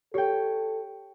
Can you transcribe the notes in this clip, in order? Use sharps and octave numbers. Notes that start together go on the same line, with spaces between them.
G4 A4 C#5 G5